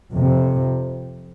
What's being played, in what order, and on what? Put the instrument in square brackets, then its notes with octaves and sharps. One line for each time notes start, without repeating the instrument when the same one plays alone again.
[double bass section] F2 C3